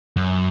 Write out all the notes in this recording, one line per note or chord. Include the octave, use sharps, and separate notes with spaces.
F#2